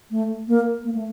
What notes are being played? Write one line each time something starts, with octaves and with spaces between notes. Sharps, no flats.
A3
A#3
A#3
A3